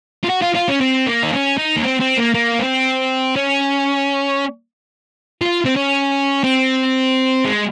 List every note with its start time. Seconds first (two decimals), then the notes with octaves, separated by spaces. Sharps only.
0.24 F4
0.30 F#4
0.42 F4
0.55 F4
0.68 C#4
0.81 C4
1.07 A#3
1.23 D#4
1.32 C#4
1.57 D#4
1.76 A#3
1.83 C4
2.00 C4
2.17 A#3
2.34 A#3
2.59 C4
3.36 C#4
5.41 F4
5.65 C4
5.76 C#4
6.44 C4
7.45 G#3